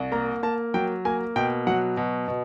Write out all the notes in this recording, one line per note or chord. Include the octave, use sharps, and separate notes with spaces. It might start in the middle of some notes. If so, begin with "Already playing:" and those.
Already playing: C2
A#3 A#5
A#3 A5
F#3 G5
A#3 G#5
B2 G5
F#3 F#5
B2
B2